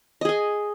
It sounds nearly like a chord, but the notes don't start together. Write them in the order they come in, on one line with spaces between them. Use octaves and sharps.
D#5 G#4 G#5